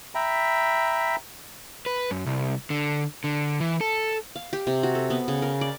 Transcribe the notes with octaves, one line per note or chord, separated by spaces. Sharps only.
E5 G5 A#5 B5
B4
F#2
C2
D3
D3
E3
A4
F5
G4
C3
F#4
A4
B3
C#3
A#4
D5